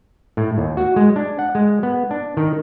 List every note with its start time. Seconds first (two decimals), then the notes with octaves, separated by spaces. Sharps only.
0.37 A2
0.58 D#2
0.77 F#4
0.96 G#3
1.16 D4
1.39 F#5
1.55 G#3
1.83 B3
2.11 D4
2.37 D#3